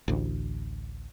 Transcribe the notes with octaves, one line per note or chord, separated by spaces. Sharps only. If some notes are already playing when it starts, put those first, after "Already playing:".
A1 D2